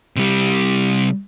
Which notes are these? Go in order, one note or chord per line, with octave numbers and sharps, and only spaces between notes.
C3 G3